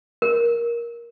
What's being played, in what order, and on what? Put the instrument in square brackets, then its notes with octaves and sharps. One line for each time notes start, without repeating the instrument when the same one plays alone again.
[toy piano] A#4